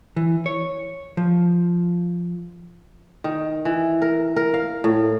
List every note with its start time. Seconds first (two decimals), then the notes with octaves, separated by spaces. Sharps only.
0.16 E3
0.46 C#5
1.17 F3
3.24 D#3
3.65 E3
4.02 A#4
4.36 A#4
4.54 F5
4.84 A2